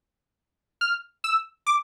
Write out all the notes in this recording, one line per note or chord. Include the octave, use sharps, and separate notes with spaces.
F6
E6
D6